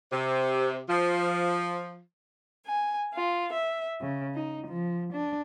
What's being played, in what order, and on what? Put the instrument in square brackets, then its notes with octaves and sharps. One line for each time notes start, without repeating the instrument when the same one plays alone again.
[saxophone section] C3
F3
[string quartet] G#5
F4
E5
C#3
D#4
F3
D4